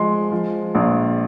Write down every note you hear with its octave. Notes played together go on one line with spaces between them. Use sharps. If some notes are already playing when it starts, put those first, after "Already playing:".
Already playing: F3 G#3 C6
F3
A#1